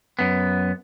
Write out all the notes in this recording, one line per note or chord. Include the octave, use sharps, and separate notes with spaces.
F#2 B3